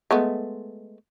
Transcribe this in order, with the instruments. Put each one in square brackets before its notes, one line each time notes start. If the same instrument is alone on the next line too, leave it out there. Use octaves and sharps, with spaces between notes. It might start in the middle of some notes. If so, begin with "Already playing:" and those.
[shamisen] G#3 A3 B3